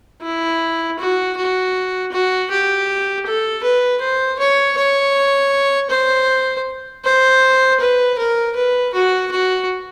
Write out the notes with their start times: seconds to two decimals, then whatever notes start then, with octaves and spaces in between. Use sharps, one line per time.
0.22 E4
0.99 F#4
1.37 F#4
2.12 F#4
2.50 G4
3.25 A4
3.63 B4
4.01 C5
4.38 C#5
4.77 C#5
5.90 C5
7.04 C5
7.79 B4
8.18 A#4
8.55 B4
8.93 F#4
9.31 F#4